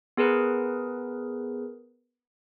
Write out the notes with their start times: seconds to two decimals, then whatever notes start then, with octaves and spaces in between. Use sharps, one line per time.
0.17 B3 G#4 A#4 B4